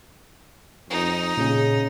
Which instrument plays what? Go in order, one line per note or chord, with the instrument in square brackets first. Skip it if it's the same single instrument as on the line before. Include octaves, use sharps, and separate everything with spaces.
[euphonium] F2 [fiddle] D#4
[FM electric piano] A#2 G#4 [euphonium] C#3